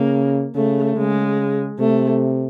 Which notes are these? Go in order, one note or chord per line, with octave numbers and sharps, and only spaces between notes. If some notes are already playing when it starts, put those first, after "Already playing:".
Already playing: C#3 A#3
C#3 A3
C#3 G#3
C3 A3